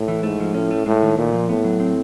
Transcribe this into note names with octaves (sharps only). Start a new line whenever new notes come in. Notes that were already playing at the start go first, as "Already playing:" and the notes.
Already playing: A2
E3
G#2 A3
F3
A2 C#4
A3
A2 G#3
D#3
A#2 A3
F3
A2 B3
F#3
C4